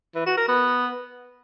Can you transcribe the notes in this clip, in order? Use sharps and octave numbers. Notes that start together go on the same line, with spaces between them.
E3
F#4
A#4
B3